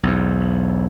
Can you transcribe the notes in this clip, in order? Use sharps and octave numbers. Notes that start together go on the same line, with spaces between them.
B1 E2